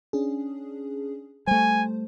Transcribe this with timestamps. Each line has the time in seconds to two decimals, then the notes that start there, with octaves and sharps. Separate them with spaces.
0.13 C#4 D4 G#4
1.47 G3 A3 C5 G#5